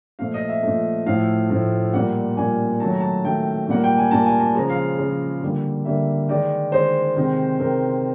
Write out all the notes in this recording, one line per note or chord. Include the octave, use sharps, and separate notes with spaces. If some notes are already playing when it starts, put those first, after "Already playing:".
A#2 F3 A3 F5
D#5
E5
A#2 F3 A3
A2 F3 A3 F5
A2 F3 A3
A#2 G3 A#3 F#5
A#2 G3 A#3 G#5
D#3 F#3 A3 A5
A#5
A5
D#3 F#3 A3 G5
A#2 G3 A#3 F#5
G5
G#5
A#2 G3 A#3 A5
G#5
A5
C#3 F3 G#3 A#5
F5
C#3 F3 G#3
D3 G3 A#3
D3 G3 A#3 E5
D#3 G#3 D5
D#3 G#3 C5
C3 D#3 G#3
C3 D#3 G#3 A#4